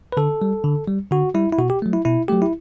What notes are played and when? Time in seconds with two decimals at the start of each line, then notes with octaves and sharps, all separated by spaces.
0.12 B4
0.17 D3 A4
0.42 G3
0.64 D3
0.87 G3
1.11 D3 F#4
1.34 G3 E4
1.52 E4
1.58 B2 F#4
1.70 G4
1.82 F#3 A3
1.93 E4
2.05 B2 E4
2.28 F#3 A3 G4
2.42 E4